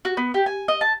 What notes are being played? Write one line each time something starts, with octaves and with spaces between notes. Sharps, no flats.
F#4
B3
G4
G#5
D#5
A5